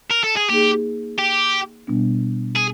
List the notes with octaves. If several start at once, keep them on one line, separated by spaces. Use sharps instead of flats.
A#4
A4
G#4
A#3 D#4 G4 G#4
G4
B2 G3 B3 D4
G#4